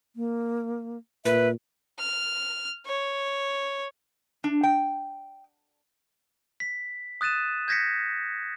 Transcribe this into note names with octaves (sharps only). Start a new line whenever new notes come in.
A#3
A#2 B4 E5
F6
C#5
D4
G5
B6
D#6 F#6 A6 D#7 E7
G6 G#6 A#6 B6 C#7